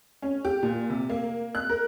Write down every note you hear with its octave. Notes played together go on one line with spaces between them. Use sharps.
C#4
G4
A#2
C3
A#3
F#6
A#4